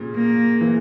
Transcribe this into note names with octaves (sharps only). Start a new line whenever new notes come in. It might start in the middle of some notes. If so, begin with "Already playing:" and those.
Already playing: A#2 C#3
A#3
E3